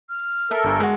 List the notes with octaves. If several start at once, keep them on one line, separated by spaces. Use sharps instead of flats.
F6
A4 A#4 E5
G1 G2 G#5
G#3 E4 F#4